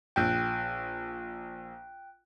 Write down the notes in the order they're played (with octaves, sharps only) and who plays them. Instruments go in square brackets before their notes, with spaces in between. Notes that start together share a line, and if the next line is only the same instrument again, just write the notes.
[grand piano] A#1 G6 [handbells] G5 F#6